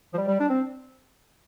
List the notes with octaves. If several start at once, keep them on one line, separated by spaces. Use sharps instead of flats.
F3
G3
G3
D4
C4